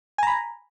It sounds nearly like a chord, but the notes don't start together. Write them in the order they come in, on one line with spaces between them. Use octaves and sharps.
G#5 A#5 B5